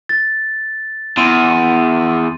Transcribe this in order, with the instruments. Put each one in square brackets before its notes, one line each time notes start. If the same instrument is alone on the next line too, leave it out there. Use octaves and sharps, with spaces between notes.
[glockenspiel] A6
[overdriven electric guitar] E2 [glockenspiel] C6 D#7